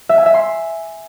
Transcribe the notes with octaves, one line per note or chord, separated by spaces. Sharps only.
E5
G#5
E5
C6